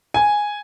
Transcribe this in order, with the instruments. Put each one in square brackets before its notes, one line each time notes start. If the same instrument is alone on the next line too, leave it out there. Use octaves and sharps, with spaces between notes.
[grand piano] G#5